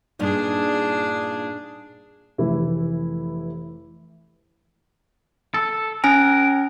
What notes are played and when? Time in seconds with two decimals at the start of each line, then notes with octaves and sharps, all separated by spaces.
0.19 G2 A#2 D4 D#4 G#4
2.38 F1 E3 E4
5.54 A4
6.04 C#4 A#4 G#5